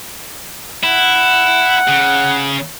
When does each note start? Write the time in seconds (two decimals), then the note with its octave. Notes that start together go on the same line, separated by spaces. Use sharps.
0.83 E4 F#5
1.88 C#3